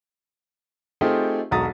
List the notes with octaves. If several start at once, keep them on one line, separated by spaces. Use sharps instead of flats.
A3 C4 D#4 F4 G4 G#4
E1 B1 F#4 A#5 D#6 A6